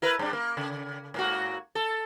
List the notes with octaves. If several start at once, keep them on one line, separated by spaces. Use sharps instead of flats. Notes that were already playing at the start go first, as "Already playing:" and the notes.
E4 A#4 B4
G2 D4
A#3
C#3
G#2 A#3 F#4
A4